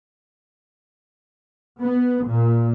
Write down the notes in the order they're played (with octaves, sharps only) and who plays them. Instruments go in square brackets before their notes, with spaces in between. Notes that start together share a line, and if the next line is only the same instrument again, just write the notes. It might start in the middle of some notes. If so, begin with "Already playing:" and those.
[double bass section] B3
A#2